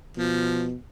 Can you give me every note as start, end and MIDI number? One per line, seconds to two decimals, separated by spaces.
0.17 0.74 47
0.17 0.67 53